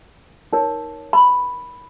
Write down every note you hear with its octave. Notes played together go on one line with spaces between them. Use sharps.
D#4 A#4 C#5
B5